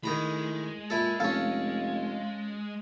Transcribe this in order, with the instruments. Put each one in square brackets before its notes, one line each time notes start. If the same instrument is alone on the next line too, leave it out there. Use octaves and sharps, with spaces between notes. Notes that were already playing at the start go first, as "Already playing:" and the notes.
[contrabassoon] A2 [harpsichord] D#3 A#5 B5 [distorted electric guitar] G#3
[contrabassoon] A#2 [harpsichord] E4 A4
[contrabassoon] F1 [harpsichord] C#4 A4 [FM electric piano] F5